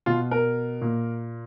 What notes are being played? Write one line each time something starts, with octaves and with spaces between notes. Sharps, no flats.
B2 F4
A#4
A#2